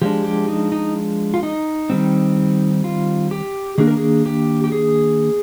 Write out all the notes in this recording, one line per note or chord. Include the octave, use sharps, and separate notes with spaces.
F3 G#3 D4 G4
G4
D#4
D#4
F4
D#4
D#3 G3 C4
F4
G4
D#3 A#3 D4 G#4
A#4
G#4
G4
G4
G#4